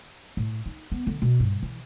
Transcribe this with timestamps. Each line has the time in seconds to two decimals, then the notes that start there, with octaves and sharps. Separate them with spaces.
0.37 A2
0.66 D#4
0.92 B3
1.07 D3
1.22 B2
1.40 G2
1.62 E3